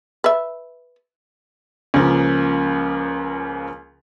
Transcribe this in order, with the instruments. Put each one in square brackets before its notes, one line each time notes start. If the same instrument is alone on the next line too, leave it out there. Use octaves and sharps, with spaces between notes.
[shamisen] B4 E5
[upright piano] C#2 C#3 F3 A#3